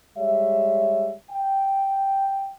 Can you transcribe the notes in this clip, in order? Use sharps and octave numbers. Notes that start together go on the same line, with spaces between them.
G3 G#3 C#5 E5
G5